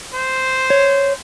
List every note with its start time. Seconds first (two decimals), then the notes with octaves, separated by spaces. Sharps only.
0.14 C5
0.70 C#5